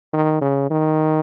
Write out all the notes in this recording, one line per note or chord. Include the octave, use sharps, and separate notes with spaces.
D#3
C#3
D#3